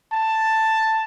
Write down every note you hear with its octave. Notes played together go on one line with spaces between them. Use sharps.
A5